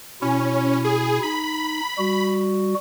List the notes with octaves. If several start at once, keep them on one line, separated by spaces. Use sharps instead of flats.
B2 C#4 E4
G#4
D#4 B5
G3 F#4